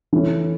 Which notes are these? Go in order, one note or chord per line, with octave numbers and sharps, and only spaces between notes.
E3 A3 C#4